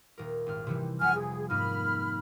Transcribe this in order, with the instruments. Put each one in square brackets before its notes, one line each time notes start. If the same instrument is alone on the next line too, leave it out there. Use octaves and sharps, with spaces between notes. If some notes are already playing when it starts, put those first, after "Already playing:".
[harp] D#1 A#4
G#1 F6
C3 E3 G3
[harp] F1 B6 [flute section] F#5 G#5 F6
[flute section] G#4
[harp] G#2 A#3 D#4 [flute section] B5 F6